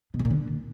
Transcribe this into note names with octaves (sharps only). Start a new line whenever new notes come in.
B2
G#2
A#2
D3